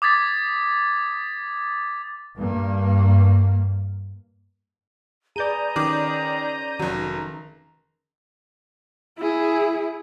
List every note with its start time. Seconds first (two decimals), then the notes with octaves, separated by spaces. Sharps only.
0.02 D6 D#6 G#6 A6 B6
2.37 G2 A#3
5.36 G#4 B4 D5 A#5 G6 D#7
5.76 D#3 C#4 D6
6.79 F1 D#3 F#3
9.18 E4 G#4